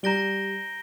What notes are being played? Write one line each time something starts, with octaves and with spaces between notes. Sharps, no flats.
G3 A#5 G6 A#6 D7 G7